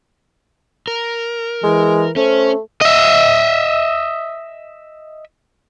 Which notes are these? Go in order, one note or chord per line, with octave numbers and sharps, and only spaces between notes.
A#4
E3 G#3
A3 C#4 C5
D#5 E5